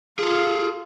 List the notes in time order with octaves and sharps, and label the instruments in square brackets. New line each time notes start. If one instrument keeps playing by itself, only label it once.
[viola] F4 F5 [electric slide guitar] G#4 A4